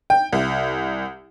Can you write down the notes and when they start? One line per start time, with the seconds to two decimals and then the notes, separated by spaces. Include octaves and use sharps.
0.10 G5
0.33 C2